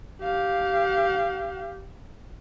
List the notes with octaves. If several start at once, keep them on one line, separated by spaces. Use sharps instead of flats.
G4 F5